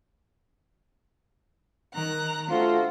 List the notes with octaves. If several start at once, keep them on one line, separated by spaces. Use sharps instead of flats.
D#3 A#5 F#6
A3 D4 F4 F#4 C5